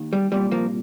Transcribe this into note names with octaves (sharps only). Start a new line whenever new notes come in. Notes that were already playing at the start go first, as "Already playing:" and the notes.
Already playing: D#2 D#3
G3
C2 A#2 G3
F3 A#3